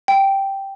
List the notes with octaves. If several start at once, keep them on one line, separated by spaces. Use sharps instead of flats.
G5